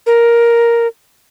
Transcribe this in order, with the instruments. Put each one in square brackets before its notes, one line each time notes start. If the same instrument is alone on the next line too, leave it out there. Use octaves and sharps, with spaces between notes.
[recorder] A#4